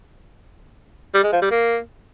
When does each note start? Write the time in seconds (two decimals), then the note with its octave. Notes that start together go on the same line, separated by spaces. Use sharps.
1.14 G3
1.23 G#3
1.33 F3
1.42 G3
1.51 A#3